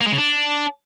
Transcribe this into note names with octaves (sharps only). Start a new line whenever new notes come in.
A#3
G#3
C#3
D4